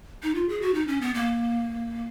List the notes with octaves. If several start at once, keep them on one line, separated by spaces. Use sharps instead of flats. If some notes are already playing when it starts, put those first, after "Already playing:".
D#4
F4
G#4
F#4
D#4
C#4
B3
A#3